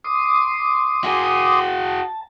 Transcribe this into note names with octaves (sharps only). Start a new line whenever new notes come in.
C6 D6 D#6
F#4 G#4
A5